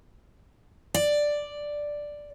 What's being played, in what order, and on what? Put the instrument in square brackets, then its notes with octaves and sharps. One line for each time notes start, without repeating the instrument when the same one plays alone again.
[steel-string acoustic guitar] D5